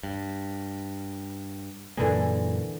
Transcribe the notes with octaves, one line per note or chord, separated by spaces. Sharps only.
G2
F#2 A#2 D3 E3 A#3 G#4